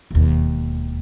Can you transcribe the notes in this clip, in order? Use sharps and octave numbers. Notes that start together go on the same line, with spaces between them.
E1 D#2